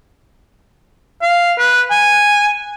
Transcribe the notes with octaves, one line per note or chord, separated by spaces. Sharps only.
F5
B4
G#5